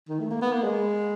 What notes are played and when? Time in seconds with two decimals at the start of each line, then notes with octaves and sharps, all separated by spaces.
0.09 D#3
0.20 A3
0.30 A#3
0.42 B3
0.53 A#3
0.64 G#3